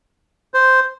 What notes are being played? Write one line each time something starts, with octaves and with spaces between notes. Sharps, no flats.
C5